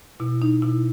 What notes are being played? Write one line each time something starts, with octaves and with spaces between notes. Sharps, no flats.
B2 E4
D#4
B2 E4